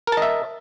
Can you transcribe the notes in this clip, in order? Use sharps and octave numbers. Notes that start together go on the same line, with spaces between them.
A#4 D#5 E5 A5